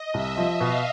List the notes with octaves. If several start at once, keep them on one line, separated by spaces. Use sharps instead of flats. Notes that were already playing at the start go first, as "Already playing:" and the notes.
Already playing: D#5
C2 E5
F3
B2 F5